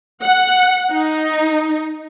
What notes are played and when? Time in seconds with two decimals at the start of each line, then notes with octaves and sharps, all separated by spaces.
0.22 F#5
0.91 D#4